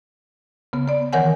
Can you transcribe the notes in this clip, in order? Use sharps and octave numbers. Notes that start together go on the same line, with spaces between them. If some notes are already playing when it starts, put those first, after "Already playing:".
C#3 B3
B3 D5
D#3 E3 A#4 C#5 F#5 G#5